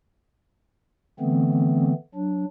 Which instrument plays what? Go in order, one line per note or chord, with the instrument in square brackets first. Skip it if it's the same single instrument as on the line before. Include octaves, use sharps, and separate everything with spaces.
[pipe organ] D3 E3 A3 B3 C4
F#3 D4